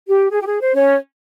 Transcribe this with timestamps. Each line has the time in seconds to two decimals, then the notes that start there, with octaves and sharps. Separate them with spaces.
0.09 G4
0.31 G#4
0.41 G4
0.46 G#4
0.60 C5
0.75 C#4 C#5